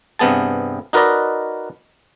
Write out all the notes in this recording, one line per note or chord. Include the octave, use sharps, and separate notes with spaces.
G2 C3 B3 G#4 A5
D#4 F#4 A#4 B4 D5 D#5